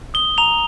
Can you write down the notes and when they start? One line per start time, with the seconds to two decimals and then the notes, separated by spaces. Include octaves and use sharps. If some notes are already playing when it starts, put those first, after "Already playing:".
0.14 D#6 G7
0.38 A#5 F7